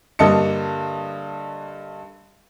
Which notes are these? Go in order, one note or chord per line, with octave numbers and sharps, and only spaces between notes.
G2 D3 A#3 D#5 A5 C#7